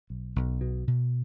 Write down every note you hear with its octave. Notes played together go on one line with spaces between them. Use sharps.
B1
B1
B2
B2